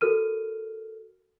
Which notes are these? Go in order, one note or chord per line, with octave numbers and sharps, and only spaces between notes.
F#4 A4 A#4 F6 D#7